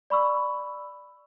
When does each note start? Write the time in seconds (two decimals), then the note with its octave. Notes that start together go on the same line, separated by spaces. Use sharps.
0.10 D5 B5 C#6 E6